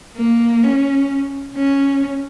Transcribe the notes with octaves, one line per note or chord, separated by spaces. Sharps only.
A#3
C#4
C#4